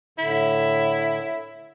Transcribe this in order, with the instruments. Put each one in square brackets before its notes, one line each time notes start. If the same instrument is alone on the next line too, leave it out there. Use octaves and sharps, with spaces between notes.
[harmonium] A2 D3 [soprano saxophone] E4